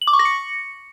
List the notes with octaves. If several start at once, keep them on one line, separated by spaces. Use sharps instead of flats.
F#7
D6
C#6
A#6
C#7